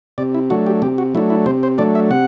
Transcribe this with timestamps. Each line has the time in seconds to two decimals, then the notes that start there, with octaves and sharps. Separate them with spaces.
0.18 C3 D5
0.35 E4
0.50 F#3 A3 D4 F#4
0.66 G4
0.82 C3 G4
0.98 F#4
1.15 F#3 A3 D4 E4
1.30 E4
1.46 C3 C5
1.63 C5
1.78 F#3 A3 D4 D5
1.95 E5
2.11 C3 F#5